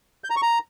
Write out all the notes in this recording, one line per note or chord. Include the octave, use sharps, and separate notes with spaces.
G6
A#5
C#6
A#5